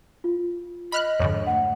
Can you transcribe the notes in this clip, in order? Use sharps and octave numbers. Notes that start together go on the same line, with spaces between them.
F4
D#5 B5 F6 F#6
F2 G#2 D3 C#5
A3 F#5